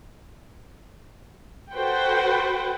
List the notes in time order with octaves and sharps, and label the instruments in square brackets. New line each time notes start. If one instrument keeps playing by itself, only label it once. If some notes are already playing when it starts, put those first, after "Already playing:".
[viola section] F#4 A4 B4 C5 F#5 G5